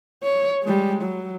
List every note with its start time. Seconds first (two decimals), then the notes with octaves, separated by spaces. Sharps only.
0.24 C#5
0.64 G3 G#3
1.02 F#3